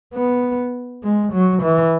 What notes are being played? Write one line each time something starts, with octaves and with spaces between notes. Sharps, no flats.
B3
G#3
F#3
E3